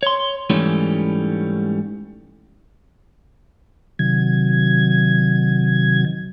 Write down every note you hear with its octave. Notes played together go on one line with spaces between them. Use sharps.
C#5 C6
G#2 E3 G3 A3 C#4
C3 D#3 F#3 G#6